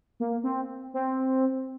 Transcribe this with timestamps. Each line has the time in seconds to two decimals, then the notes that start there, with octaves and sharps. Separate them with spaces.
0.20 A#3
0.44 C4
0.94 C4